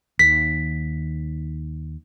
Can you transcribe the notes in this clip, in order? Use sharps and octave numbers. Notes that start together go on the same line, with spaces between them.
D#2 D#3 B6